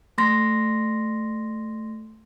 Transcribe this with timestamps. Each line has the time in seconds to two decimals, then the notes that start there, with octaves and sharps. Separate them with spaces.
0.18 A3 C6 A#6